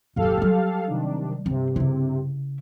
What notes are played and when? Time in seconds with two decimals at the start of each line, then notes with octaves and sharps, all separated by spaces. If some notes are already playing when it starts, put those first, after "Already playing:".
0.16 D#1 F#2 G4 A4 F5
0.38 F#3 G3
0.87 C3 D#3 D4
1.46 G2 C3 C4
1.76 C#3 E4